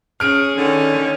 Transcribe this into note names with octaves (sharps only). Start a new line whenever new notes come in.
C#4 G#4 F6 D7
D3 D#3 C#4